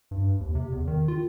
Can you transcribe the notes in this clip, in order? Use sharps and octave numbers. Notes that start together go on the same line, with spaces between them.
G2
D#2
C3
E2
D#3
F4